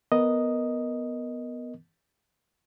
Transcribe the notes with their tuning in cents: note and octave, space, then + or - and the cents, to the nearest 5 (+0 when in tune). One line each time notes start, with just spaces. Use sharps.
B3 +0 A#4 +0 D#5 +0